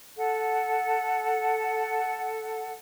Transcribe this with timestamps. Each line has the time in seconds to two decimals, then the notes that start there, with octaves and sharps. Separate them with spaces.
0.17 A4 F#5